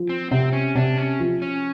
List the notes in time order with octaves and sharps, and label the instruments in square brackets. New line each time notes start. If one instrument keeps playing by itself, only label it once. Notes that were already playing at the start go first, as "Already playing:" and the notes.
Already playing: [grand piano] F3
[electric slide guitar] C4
[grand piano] C3 [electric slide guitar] C4
[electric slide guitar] C#4
[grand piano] C3 [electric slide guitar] D4
[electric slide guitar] C#4
[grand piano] F3
[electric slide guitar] C#4